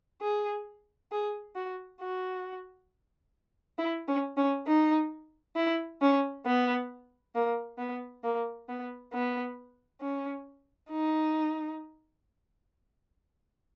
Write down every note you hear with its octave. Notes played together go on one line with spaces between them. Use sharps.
G#4
G#4
F#4
F#4
E4
C#4
C#4
D#4
E4
C#4
B3
A#3
B3
A#3
B3
B3
C#4
D#4